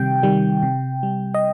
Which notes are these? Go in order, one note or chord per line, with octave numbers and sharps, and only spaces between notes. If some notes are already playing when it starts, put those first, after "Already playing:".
Already playing: C3 D#3 G3 G5
D#3 G3
C3
G3
D#5